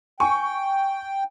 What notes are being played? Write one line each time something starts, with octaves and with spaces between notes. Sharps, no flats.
G5 G#5 C#6